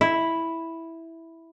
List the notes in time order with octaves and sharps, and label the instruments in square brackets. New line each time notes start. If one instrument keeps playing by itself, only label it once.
[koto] E4